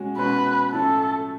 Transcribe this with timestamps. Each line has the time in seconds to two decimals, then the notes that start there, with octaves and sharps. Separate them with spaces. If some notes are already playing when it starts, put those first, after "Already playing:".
Already playing: B2 G#3 C#4 F#4
0.17 B2 G#3 C#4 F#4 B4
0.72 A2 F3 A3 C#4 A4